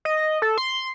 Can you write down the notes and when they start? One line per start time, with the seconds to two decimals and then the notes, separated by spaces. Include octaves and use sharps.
0.05 D#5
0.42 A4
0.58 C6